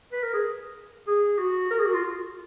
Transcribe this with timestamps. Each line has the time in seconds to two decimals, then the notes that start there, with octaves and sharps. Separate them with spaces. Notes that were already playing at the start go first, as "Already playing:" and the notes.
0.12 B4
0.23 A#4
0.33 G#4
1.07 G#4
1.38 F#4
1.71 A#4
1.79 G#4
1.86 F#4
1.94 F4